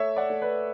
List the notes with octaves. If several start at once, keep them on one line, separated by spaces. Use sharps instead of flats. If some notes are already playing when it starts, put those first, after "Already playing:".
Already playing: A3 C#5 E5
D5 F#5
A3
B4 D5